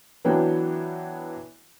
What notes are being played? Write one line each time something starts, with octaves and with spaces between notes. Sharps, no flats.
E3 F#3 B3 D4 G5